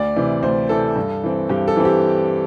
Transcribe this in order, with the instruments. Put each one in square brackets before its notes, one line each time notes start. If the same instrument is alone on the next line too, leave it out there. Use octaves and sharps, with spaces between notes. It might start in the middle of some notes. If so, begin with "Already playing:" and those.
Already playing: [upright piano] D2 D5
C3 E3
D2 C5
C3 E3 A4
G2
E3 C4
G2 G4
A4
E3 C4
G4